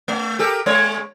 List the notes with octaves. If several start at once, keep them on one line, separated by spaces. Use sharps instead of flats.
A3
G4 A4 A#4
G#3 C#5